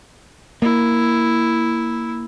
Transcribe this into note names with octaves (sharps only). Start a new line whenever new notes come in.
A#3 E4